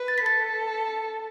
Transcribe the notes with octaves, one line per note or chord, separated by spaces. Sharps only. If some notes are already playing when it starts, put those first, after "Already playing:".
Already playing: B4
A6
B6
A4 A6